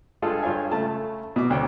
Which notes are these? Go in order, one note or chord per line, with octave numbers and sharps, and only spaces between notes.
G2 G#3 F4 A4
G2 F4 C#5 F5 G#5
C#3 A3 A5
B2 D6
D2 C4 C#5 G5